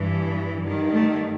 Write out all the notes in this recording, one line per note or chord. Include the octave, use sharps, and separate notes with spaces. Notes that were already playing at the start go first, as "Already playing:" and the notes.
Already playing: G2 E3
G2
D#3
A3